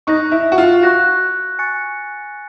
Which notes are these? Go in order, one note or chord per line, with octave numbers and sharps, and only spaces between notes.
D#4 C#6 F#6 A#6
E4
F#4
F4
F#4 C#6 F#6 A#6
G#5 C#6 F#6 A6 C#7